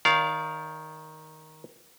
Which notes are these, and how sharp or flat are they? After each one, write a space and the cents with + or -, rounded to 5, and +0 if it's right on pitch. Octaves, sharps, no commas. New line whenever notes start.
D#3 +5 D5 -35 F5 +0